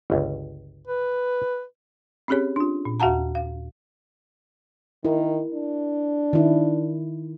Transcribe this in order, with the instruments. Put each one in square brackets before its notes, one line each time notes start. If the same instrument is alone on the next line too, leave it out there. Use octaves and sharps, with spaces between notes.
[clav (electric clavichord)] G1 C#2
[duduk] B4
[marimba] C4 C#4 G4 G#4 C#5
D4 F4
A#2
D#2 F#4 F5 F#5 A5 A#5
F5
[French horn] D#3 [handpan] E4 A#4
[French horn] D4
[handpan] D#3 E4